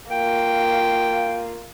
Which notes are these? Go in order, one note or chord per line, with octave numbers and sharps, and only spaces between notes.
A#3 F4 G5